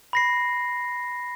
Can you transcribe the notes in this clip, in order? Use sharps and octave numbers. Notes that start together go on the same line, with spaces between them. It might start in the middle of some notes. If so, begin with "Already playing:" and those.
B5 A#6 C7